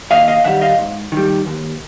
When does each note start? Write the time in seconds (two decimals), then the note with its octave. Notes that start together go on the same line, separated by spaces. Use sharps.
0.11 D#2 D#5 F5
0.28 D#5 F5
0.44 D#3 G3 E5 F#5
0.61 D#5 F5
0.79 G#2
1.12 D#3 G3
1.46 D#2